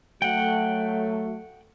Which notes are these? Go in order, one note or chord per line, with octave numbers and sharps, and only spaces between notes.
F#3 A3 F#5 G5